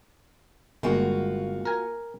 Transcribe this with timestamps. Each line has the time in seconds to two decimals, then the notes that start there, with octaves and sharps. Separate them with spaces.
0.83 G1 G#3 A#3 F4 F#4
1.65 A#4 G#5